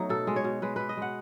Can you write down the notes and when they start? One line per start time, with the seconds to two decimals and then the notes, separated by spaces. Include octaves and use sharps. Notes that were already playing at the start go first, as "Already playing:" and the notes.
Already playing: F#3 A3 B3 D#4
0.09 B2 A4
0.27 G#3
0.36 C#5
0.44 B2
0.62 G#3 B4
0.76 B2 B4
0.89 D#5
0.97 G#3 F#5